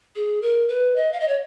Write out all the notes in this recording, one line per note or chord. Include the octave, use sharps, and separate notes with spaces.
G#4
A#4
B4
D#5
F5
D#5
C#5